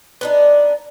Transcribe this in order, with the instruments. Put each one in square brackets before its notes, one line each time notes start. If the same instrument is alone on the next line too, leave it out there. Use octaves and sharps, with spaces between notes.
[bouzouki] B3 D4 D#4